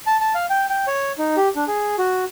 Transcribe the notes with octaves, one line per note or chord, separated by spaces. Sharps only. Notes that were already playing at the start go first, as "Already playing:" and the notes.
A5
A5
F5
G5
G5
C#5
D#4
G4
D4
G#4
F#4